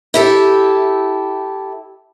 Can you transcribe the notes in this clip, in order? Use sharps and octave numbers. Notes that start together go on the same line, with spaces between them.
E4 G4 A4